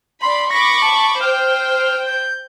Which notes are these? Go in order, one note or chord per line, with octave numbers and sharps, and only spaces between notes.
D5 B5 C6
B5 C#6 D6 A#6
A5
C5 G5 F6
G6